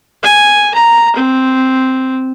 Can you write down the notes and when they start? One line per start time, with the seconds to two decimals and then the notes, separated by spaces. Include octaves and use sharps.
0.23 G#5
0.74 A#5
1.16 C4